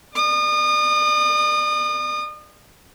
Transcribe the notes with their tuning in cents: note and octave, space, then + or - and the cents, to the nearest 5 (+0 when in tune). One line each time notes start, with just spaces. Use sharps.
D5 +35 D#6 -35